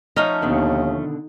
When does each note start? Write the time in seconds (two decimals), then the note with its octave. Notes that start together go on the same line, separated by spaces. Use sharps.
0.16 F3 A3 C#4 D#4
0.42 D#2 B2 D3 D#3